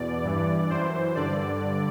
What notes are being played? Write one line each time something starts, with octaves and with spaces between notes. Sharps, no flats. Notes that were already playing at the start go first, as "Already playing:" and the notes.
Already playing: E2 B2 D5
G2 E3
F#2 E3 C5
G2 D3 D5